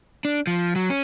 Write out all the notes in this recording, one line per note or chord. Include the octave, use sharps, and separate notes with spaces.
D4
F3
F#3
C#4